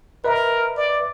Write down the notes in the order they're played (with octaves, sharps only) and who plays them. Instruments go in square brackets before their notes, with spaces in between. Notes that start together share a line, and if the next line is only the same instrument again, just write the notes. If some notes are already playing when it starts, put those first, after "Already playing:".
[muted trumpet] A#4 [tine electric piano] B4 D#5 E5
[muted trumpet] D5